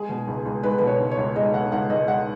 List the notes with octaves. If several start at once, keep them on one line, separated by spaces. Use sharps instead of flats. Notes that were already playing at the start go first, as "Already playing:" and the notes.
Already playing: G#3 G#4
B2
C#2
C#2
G#3 B4
B2 B4
C#5
C#2
C#5
C#2
G#3 D#5
B2 F#5
C#2 F#5
C#2 D#5
G#3 F#5